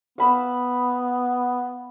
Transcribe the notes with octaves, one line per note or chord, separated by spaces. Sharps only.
B3 F5 B5 E6